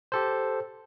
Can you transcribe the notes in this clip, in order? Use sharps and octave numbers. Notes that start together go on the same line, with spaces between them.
G4 A4 C5